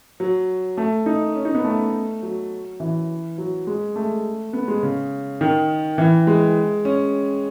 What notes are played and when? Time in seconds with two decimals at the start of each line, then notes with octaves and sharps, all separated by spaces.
0.20 F#3
0.77 A3
1.06 D#4
1.35 C#4
1.45 D#4
1.55 B3
1.65 A3
2.22 F#3
2.80 E3
3.38 F#3
3.67 G#3
3.96 A3
4.53 B3
4.68 G#3
4.83 C#3
5.41 D#3
5.98 E3
6.27 G#3
6.85 C#4